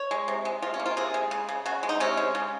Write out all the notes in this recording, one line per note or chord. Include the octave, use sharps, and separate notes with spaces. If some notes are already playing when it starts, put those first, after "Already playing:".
Already playing: C#5
G#3
C3
G#3
C3 F4
C#4
A#3
F4
C3 G#4
G#3
C#3
C#3
C#3 F#4
G#3
D#4
C3 C#4
G#3
C#3